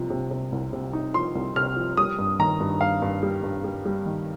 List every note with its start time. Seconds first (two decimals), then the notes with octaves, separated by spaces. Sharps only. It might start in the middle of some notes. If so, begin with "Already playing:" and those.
Already playing: C2 C3 F3
0.10 C3
0.31 C3
0.52 C2
0.73 C3
0.93 D#4
1.14 F3 C6
1.35 C2
1.56 C3 F6
1.76 F3
1.97 G3 D#6
2.19 G2
2.39 D#3 A#5
2.60 G2
2.81 G2 F5
3.02 G2
3.23 G3
3.44 G2
3.64 G3
3.85 G3
4.06 D#3